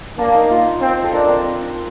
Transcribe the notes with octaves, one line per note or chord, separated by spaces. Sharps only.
A#3 D4
D#4
F4
C4
A4
D4 A#4
C4